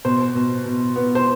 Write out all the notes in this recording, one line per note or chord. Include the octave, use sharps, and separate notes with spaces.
B2 C5
B2
B2
B3
C5